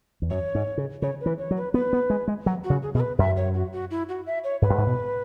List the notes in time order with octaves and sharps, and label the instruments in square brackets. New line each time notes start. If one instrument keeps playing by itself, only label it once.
[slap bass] E2
[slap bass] F#2 [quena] C#5
[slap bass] G#2
C#3
[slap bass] C#3 [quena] C#5
[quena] B4
[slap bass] E3
[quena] C#5
[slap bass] F#3
[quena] B4
[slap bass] B3 [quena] B4
[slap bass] B3
G#3
G#3
F#3
[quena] F#4
[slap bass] C#3
[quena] G#4
[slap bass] B2 [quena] G#4
[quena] B4
[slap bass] F#2 [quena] E5
[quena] C#5
F#4
F#4
E4
F#4
E5
C#5
[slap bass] G#2 [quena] B4
[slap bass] F#2
G#2
B2